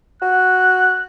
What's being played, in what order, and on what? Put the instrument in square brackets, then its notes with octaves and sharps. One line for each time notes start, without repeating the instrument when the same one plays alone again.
[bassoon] F#4 [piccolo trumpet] F#6